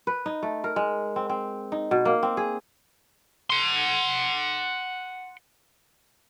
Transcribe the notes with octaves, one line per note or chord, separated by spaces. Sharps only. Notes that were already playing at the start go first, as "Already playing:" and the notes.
B4
D#4
A3
A#4
G#3
C4
C4
D#4
B2
A#3
C4
G#4
F#5 C6